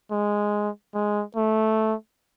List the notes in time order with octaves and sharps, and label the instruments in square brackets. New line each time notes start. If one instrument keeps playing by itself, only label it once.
[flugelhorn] G#3
G#3
A3